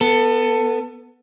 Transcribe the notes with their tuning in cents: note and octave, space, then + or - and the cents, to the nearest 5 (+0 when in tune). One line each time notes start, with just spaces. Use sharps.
B3 -5 A4 +20